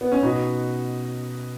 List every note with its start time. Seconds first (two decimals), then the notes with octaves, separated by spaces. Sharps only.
0.01 B3
0.12 C#4
0.22 B2 B3 D#4 F#4 B4